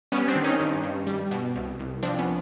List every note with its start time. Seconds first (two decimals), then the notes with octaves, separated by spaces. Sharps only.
0.12 G3 B3 C#4
0.28 C4 D4
0.36 D#3
0.44 C#4 D#4
0.60 G2
0.84 G2
1.07 G3
1.31 B2
1.56 C2
1.79 C2
2.03 F3 C4 D4
2.19 B3 C#4